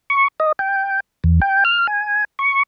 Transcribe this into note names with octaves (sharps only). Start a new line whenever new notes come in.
C#6
D#5
G5
E2
G5
F6
G#5
C#6